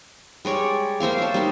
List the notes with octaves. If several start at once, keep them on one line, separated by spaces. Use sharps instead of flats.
G3 G#3 C#5 D5
A#3 C5 E5 F5
C#5 A5
G3 A#3 D#4